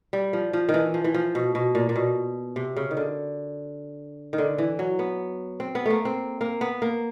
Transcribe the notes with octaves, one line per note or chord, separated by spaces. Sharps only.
G3
F3
F3
D#3
E3
F3
E3
F3
B2
B2
A#2
A#2
B2
C3
C#3
D#3
D3
D#3
D3
E3
F#3
B3
C4
B3
A3 A#3
C4
A#3
B3
A#3